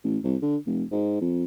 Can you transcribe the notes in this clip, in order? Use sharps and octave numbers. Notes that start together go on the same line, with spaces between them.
A1
C2
D3
F1
G#2
F2